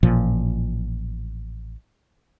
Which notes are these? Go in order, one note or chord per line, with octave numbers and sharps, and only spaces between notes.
A1 A#2 F3